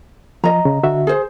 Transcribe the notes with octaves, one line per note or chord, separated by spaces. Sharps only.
F3 D#5 A#5
C#3
D3 F#4 E5
G#4 C5